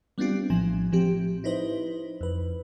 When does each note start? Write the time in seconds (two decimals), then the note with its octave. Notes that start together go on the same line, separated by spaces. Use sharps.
0.18 G3 B3 C4 D4 F4 G4
0.50 A#1 A2 F3 G#5
0.92 A2 F3 C4 G4
1.44 D#4 E4 B4 C5 D#5
2.21 F2 B4